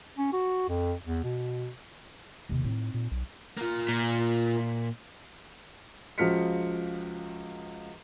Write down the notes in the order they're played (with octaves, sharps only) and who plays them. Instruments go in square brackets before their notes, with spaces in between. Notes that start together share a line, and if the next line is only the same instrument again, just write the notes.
[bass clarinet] C#4
F#4
F2
E2
B2
[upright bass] D#2 C3
[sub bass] A2 [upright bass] C4 D#4
[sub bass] A#2
B1
[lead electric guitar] A#3 F4
[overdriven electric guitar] A#2
[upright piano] C#2 F3 F#4 F6 B6 C#7